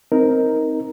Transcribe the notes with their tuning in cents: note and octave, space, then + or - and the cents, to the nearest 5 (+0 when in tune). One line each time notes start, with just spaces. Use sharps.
C4 +0 D#4 +15 A#4 +0